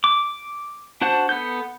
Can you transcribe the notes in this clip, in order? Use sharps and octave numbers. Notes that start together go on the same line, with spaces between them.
D6
D4 F#4 C5 F#5 A5
B3 A4 G6